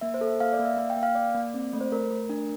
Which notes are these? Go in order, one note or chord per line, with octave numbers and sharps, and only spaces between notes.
A#3 E5
C5
A4
E5
A#3 F5
D5
A#3
E5
A#3 F5
G5
A#3
F5
A#3 D5
A#3
C4
A3
C5
A3 A#4
A3
D4